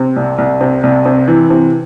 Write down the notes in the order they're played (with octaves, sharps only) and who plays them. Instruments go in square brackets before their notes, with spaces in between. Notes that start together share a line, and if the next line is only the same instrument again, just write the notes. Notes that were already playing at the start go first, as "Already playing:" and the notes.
Already playing: [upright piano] C3
C2
C2
C3
C2
C3
E3
C3